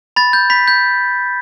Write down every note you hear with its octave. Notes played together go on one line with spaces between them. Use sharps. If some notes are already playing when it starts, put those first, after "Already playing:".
B5 A6
G6
B5 B6
G6